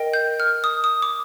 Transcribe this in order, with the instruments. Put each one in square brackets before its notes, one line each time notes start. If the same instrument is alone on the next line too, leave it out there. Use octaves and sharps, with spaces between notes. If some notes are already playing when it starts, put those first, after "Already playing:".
Already playing: [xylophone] A#4 D#5 G5
G6
F6
D#6
D#6
D6